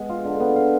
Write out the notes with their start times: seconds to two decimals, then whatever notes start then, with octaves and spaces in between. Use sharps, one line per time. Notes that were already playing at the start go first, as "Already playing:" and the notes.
Already playing: G#3 B3
0.09 F4
0.25 D3
0.40 B3
0.56 F4